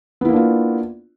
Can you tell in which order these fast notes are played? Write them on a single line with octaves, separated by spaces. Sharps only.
B3 E4 A#3 D4 F4